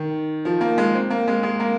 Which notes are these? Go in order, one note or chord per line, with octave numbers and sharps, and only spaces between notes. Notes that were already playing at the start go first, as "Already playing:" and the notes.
Already playing: D#3
F3
A#3
G#3
C4
A#3
G#3
G#3
A#3